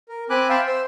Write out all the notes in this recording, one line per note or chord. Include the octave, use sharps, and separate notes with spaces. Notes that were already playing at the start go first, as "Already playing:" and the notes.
A#4
C4 G#5 B5 D6 F#6
E5 F5 G5 A5 B5 C6
C5 C6 E6